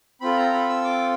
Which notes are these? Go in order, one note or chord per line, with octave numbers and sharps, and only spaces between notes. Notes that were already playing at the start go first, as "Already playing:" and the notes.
C4 F4 A4 B5
A#5
B5
E6
D6